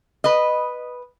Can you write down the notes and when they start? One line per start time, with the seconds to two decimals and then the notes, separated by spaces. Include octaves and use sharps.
0.24 B4 D#5